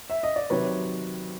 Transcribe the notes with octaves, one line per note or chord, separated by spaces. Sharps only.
E5
D#5
D5
C3 D#3 F#3 B4 C#5